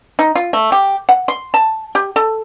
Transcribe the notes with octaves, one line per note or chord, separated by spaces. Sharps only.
D#4
F4
A3
G4
F#5
C6
A5
G4
A4